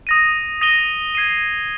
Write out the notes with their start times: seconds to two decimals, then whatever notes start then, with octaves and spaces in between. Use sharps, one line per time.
0.07 D#6 A#6 D#7
0.61 D#6 A#6 D#7 G7
1.15 G#6 C7 D#7